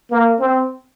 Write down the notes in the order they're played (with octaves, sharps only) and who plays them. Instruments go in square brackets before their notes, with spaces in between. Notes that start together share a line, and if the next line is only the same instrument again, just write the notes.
[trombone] A#3
C4